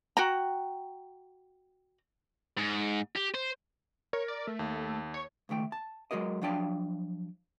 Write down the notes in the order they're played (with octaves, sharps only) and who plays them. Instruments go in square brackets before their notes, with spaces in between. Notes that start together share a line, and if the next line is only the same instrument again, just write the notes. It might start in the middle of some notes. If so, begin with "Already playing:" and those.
[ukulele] F#4 G5 A#5
[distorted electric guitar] G#2
G4
C5
[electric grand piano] A#4 [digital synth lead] C#5
[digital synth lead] D5
A3
[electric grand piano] D#2
[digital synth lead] C#5
[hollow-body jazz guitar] C#2 D#3 A3 G5
A5
F#3 G#3 F#4 A#4 D#5
F3 F#3 D4 F5 G5 A5